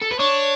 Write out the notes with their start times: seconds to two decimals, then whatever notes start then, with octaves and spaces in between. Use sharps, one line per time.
0.01 A4
0.11 B4
0.19 D4 C#5